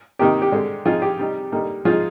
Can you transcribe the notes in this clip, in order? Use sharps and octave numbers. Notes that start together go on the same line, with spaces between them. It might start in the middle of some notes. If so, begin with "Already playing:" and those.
C3 D#3 A#3 D#4 G4
G4
D3 G#3 C4
F3 C4 D#4 F4 G#4
G4
C3 G3 C4 D#4
D3 G3 A#3 D#4
F3 G#3 D#4 F4 G#4